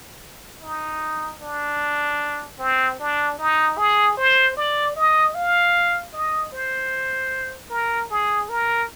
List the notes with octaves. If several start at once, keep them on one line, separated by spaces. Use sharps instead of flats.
D#4
D4
C4
D4
D#4
G#4
C5
D5
D#5
F5
D#5
C5
A#4
G#4
A#4